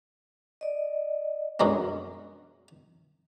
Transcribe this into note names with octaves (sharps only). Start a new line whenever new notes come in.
D5 D#5
F#2 D3 F#3 G#3 B3